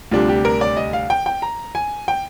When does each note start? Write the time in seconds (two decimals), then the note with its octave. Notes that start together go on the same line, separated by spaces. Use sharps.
0.11 D2 C3 G3 D4 F4
0.28 G4
0.45 A#4
0.61 D5
0.77 D#5
0.93 F5
1.10 G5
1.26 G5
1.42 A#5
1.75 G#5
2.08 G5